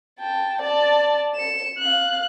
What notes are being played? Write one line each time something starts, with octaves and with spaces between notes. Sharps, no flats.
G5 A5
D5 A5
C#7 E7
F5 F#6